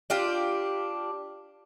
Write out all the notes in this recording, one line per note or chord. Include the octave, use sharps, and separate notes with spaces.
D4 F4 G4